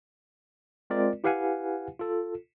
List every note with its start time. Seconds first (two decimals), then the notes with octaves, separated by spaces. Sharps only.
0.90 G#3 C4 F4 A#4 D5
1.24 E4 G4 B4 F5 F#5 G#5
1.99 F4 A4